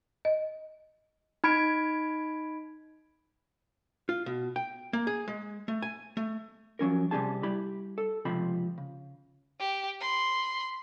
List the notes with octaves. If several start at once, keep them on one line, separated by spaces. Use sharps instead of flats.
D#5
D#4 B5 G#6 D7
F4
B2
G5
A#3
G#4
G#3
A3
G#5
A3
F3 F#3 C#4 A#4
C2 C3 G3 C#4 G#4 A5
G3 E4 G4 B5
A4
C#2 C3 F3 B5
C#3
G4
B5 C6